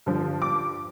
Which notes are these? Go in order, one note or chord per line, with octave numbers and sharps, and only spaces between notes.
G2 D3 F3
D6